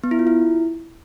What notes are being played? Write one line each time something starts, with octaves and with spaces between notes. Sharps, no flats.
B3
E4
F4
E4